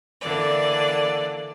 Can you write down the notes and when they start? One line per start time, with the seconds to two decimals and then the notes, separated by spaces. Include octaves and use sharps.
0.21 D3 E3 A#3 D5